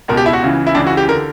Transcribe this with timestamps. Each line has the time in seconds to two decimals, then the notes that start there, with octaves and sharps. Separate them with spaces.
0.08 C#2 B2 A#4
0.17 G4
0.26 E4
0.33 F#4
0.42 C#2 C#3 E3
0.67 E4
0.75 C#2 C#3 E3 D4
0.87 F#4
0.97 G4
1.08 D3 A#4